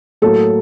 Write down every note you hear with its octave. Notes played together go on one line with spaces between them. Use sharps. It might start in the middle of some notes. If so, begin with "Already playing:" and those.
A2 F#3 A#3 A4